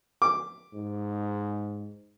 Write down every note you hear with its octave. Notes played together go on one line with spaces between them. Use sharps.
D6
G#2